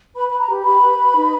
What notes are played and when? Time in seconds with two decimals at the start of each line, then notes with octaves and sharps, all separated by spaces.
0.15 B4 B5
0.28 B4 B5
0.40 A#5
0.49 G4
0.65 G4 B5
0.82 B4
0.98 B4
1.16 D#4